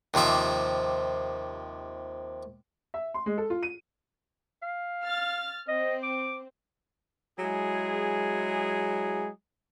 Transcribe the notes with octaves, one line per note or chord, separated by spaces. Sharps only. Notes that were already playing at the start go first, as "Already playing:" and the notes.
D#2 C3 F3 E5 D6
E5
C6
G#3
A4
F4
D#7
F5
F6 A6
C4 D#5
D6
F#3 G#3 E4 G#4